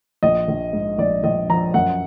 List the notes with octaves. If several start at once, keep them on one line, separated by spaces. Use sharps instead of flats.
A#1 D#5
A#1
G#2
A#1 D5
A#1 D#5
F3 A#5
F#2 F#5